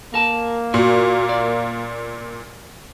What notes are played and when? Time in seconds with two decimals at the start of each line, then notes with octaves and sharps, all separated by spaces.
0.14 A#3 A#4 A5
0.74 A#2 F#4
1.29 D5